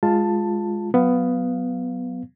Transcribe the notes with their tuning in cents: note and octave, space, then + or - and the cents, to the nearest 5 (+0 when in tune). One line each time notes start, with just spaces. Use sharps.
G#3 +0 F4 +0 A5 +10
F#3 +0 B3 +10 F5 +0